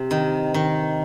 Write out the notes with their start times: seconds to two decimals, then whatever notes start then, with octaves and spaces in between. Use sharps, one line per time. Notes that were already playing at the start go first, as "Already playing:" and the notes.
Already playing: C3
0.11 D#3
0.54 D#3